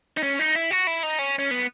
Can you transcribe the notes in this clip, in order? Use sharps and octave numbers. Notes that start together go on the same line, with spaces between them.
D#4
C#4
D#4
E4
F#4
E4
D#4
C#4
C#4
B3